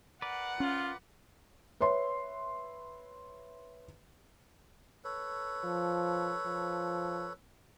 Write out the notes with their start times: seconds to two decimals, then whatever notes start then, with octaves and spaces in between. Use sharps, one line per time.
0.22 A#4 B4 D5 F#5
0.60 C#4 F4
1.80 B4 C#5 E5 C6
5.04 A4 B4 C#5
5.64 F3
6.46 F3